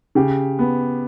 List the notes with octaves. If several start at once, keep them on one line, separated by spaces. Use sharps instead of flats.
C#3 G4
B3